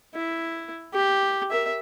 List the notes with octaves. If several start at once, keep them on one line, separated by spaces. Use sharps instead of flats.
E4
G4
A#4 E5